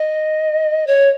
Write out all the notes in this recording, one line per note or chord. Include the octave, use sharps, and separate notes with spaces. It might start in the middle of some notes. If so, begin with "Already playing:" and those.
Already playing: D#5
C#5